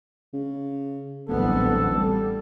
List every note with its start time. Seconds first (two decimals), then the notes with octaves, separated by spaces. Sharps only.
0.33 C#3
1.30 D1 A1 G3 B3 A4
1.91 G3